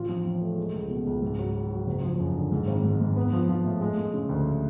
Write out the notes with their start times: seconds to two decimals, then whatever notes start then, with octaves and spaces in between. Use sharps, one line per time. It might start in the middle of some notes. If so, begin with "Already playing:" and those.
Already playing: A1 F4
0.09 F3
0.25 F3
0.41 A3
0.58 G#3
0.73 C#2
0.90 B2
1.07 C#2
1.22 G#2
1.39 F#3
1.55 F#3
1.71 F#3
1.87 F#1
2.03 F3
2.20 F#2
2.36 D3
2.52 G#2
2.67 G#1
2.84 G#2
3.01 G#2
3.16 B3
3.33 F3
3.49 F3
3.64 A2
3.81 G#3
3.98 G#3
4.14 C#3
4.29 D2